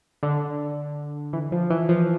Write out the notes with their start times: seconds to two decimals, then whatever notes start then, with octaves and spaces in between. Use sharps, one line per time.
0.23 D3
1.33 E3
1.52 F3
1.70 E3
1.89 F3